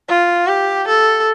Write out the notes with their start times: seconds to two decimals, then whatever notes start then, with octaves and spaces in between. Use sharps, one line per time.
0.08 F4
0.48 G4
0.88 A4